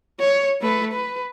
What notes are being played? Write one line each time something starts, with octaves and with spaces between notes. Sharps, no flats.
C#5
A3 B4
B4